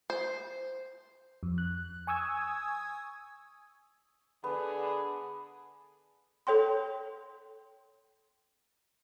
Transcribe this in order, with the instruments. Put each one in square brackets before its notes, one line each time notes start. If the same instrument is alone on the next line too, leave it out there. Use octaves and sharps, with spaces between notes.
[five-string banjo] C5
[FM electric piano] F2
F#6
G#5 C#6 D#6 E6 G#6
[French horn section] D3 G#4 [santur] B3
[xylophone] A4 C#5 G5 C6